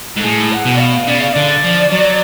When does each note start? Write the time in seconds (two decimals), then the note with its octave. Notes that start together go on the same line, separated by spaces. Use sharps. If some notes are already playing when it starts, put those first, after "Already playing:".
0.17 G#2 A4
0.24 A2 G#4
0.52 F#5
0.66 B2
0.76 D5
0.79 F5
1.08 C#3 D5
1.21 F5
1.33 D3 D5
1.64 F3
1.92 F#3